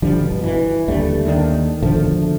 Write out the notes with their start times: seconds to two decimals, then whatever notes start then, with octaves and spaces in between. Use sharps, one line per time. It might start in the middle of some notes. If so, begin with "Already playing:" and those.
0.02 D3 F3 G3
0.21 G1 B2
0.44 E3
0.88 D#2 D3 G3 A3
1.25 D#2 D#3 F3 D4
1.83 B2 D3 F3 A3